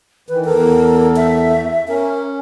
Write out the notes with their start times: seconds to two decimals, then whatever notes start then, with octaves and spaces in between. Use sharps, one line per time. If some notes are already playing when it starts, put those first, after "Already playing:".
0.29 D#3 E3 B4
0.45 E2 A4 A#4
1.16 E5
1.88 C#4 A#4